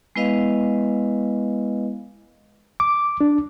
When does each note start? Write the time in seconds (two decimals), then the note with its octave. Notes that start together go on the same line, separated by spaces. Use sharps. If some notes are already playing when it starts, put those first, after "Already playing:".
0.16 G#3 B3 E4 B4 D#5 F5
2.80 D6
3.21 D4